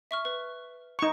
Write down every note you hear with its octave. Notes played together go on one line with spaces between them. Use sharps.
E5 C#6 F6
B4
D#4 C#6